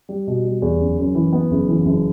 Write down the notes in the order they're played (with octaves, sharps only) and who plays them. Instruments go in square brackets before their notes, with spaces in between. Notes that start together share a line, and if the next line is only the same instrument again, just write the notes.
[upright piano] G3
B2
G3
E2
F#1
F#2
E3
B3
F#1
E3
F#1